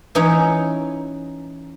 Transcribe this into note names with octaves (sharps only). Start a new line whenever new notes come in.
E3 C#4 D#4